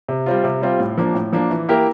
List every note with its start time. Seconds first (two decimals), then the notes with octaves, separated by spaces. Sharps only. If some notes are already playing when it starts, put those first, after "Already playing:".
0.09 C3
0.26 G3 C4 F4
0.44 C3
0.62 G3 C4 F4
0.79 A2
0.98 F3 A#3 D4
1.15 A2
1.33 F3 A#3 D4
1.50 E3
1.69 A#3 E4 G4 A#4